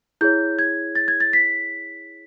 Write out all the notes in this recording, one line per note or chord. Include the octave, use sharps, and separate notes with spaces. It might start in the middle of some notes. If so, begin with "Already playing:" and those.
E4 G#4 C#5 G6
G#6
A6
G#6
A6
B6